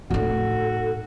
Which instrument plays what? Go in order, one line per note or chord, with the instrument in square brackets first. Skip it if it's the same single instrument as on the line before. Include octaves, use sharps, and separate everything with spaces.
[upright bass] A2 D#4 [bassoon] F#4 [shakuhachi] A4